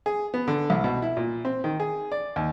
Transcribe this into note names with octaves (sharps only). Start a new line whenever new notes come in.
G#4
B3
D3
C2
B2
E4
A#2
C4
D#3
G#4
D5
D#2